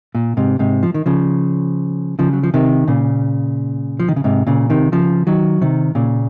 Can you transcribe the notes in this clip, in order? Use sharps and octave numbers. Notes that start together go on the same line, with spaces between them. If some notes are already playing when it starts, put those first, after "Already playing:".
A#2
G#2 C3
G#2 C3
F3
D#3
C#3 F3
C#3 F3
F#3
F3
C3 D#3
A#2 C#3
F3
D#3
C#3
G#2 C3
A#2 C#3
C3 D#3
C#3 F3
D#3 F#3
C3 D#3
A#2 C#3